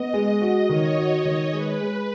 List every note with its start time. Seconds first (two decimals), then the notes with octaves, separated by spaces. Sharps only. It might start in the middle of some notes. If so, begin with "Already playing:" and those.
Already playing: B3 D#5
0.14 G#3
0.41 F#4
0.69 D#3 C#5
0.97 F#4
1.25 D#3
1.53 G#3 B4
1.81 G#3